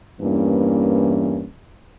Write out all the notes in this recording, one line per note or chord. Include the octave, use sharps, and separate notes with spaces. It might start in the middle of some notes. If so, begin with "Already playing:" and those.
E2 G2 E3 A#3 C#4